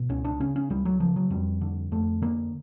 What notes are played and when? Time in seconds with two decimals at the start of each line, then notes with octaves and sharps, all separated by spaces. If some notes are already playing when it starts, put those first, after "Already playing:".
Already playing: B2
0.09 C#2 C#4
0.25 D4
0.40 C#3 C#4
0.56 C#4
0.70 C#2 G3
0.85 F#3
1.00 C#3 F3
1.16 F#3
1.31 F2 G3
1.61 D3
1.92 F2 A3
2.22 D3 A#3